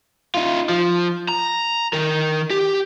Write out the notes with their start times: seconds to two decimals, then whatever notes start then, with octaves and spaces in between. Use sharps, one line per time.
0.35 D#4 F4
0.69 F3
1.29 A#5
1.93 D#3 A#4
2.50 G4